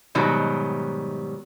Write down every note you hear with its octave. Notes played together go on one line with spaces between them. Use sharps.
G#2 B2 D#3 F#3 G3